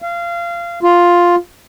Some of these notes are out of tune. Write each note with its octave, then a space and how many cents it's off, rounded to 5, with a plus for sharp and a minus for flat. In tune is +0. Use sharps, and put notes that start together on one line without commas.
F5 -25
F4 +5